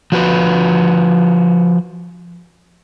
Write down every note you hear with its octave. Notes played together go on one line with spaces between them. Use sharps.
F3 F#4 B4